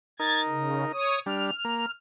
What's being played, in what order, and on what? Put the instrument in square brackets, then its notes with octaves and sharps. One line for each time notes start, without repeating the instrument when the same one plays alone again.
[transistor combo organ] D#4 A#4 [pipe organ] G#6 A6
[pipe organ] C#3
C#5 D#6
[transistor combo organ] G3 D4 [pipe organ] F6
[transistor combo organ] A#3